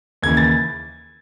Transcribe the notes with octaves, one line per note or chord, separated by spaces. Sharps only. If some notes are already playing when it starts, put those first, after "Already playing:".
D#2 C#3 E3 G#6
A6